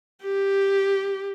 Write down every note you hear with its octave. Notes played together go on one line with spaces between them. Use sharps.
G4